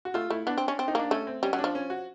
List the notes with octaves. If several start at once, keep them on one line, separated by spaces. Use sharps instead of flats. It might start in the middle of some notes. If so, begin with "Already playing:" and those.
F#4
A3 F4
A3 E4
B3 D4
C4
C#4
C4
D#4
A#3 D4
A3 C#4
C4
G3 C#4
F#3 C#4
D4
F3
C#4
F#4